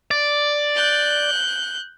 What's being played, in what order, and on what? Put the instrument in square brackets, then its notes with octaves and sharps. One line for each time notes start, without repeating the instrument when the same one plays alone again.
[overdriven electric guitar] D5
[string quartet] F#6 G6